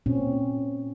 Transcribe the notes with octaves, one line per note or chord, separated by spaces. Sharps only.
A#2 C4 C#4